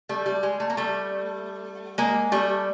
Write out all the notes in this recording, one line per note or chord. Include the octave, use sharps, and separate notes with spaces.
G3 A3
G3
G#3
A3
A#3
G3 A3
G#3 A#3
G3 A3